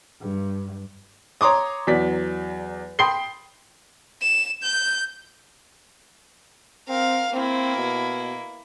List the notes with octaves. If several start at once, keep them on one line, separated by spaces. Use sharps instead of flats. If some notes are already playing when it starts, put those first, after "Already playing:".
G2
C#5 A#5 C6 D6 D#6
E2 F#3 D5 B6
G5 B5 C6 D#6 C7 G7
E7
G6
C4 A#4 F5
A#3 C4 E4
B2